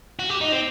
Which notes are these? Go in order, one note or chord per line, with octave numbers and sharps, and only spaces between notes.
F#4
G4
D#4
C4